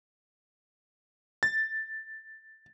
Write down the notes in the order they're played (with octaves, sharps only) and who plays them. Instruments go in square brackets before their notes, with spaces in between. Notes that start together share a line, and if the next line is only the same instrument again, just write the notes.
[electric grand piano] A6